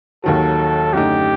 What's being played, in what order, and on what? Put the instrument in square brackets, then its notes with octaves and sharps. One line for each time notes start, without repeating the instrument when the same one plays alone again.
[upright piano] D#2 D#3 F#3 [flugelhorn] A4
[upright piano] F#2 D3 A3 D#4 [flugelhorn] G4